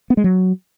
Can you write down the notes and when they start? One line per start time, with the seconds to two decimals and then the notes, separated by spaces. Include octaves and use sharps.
0.10 B3
0.17 G#3
0.24 F#3